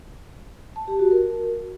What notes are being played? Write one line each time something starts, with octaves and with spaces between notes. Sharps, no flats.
A5
G4
F#4
A#4